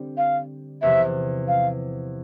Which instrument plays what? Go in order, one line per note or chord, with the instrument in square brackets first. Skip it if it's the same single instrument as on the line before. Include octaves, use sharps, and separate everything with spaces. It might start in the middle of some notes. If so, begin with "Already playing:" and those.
Already playing: [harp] D3 G3 C4
[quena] F5
[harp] E2 C3 F3 [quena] E5
[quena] F5